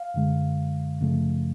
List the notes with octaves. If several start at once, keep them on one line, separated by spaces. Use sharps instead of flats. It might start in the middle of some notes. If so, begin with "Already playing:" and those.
Already playing: F5
F#2 D3 G#3
F#2 C#3 F3 A3